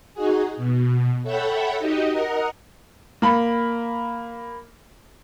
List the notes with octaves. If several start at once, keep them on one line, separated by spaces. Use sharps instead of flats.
D#4 F#4 G#4
B2
A4 C#5 E5 F#5 G5 B5
D#4 F#4 G4 D#5
A#4 D#5 F#5 A#5
A#3 B5